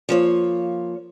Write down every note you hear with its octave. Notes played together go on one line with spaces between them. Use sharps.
F3 A#3 C#5